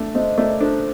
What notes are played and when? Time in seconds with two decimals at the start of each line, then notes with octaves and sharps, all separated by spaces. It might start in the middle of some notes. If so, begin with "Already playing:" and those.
Already playing: A3 D4
0.15 A3 C5 D#5
0.38 A3 A#4 D5
0.60 D4 A4 C5